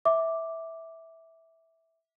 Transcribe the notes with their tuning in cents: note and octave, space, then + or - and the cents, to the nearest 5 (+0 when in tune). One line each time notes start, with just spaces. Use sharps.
E5 -10 D6 +0